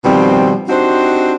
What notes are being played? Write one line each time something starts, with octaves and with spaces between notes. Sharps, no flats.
B2 D#3 F3 G3 C4
C4 D4 D#4 F#4 G4 C5